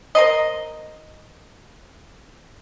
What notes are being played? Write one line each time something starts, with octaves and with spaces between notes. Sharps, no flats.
A#4 C5 D#5